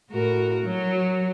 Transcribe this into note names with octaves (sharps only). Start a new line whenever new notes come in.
A2 F#4 A#4
F#3